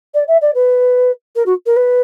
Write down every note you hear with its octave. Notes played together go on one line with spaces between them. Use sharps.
D5
E5
D5
B4
A#4
F#4
A#4
B4